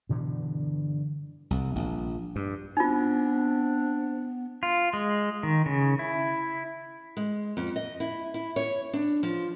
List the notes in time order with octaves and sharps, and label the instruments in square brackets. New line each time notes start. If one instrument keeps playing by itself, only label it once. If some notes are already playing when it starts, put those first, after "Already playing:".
[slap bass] G2 B2 D3 E3
C2
A#1
G2
[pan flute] B3 [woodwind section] C4 D4 [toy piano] D#4 F4
[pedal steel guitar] F4
G#3
D#3
C#3
E4
[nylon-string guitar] G#3
F2
D#5
E4
E4
C#5
D4
F3